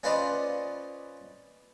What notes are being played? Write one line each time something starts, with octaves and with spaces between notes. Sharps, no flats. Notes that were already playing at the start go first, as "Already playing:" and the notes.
C#4 F4 B4 C5 D5 D#5